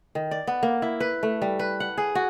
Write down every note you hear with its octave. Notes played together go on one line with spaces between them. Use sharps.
D#3
D5
B3
A#3
E4
B4
A3
G3
B4
F#5
G#4
F#4